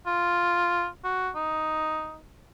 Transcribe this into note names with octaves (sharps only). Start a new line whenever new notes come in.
F4
F#4
D#4